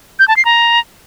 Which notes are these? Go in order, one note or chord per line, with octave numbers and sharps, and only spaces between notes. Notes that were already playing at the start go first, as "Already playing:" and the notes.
G6
A5
C7
A#5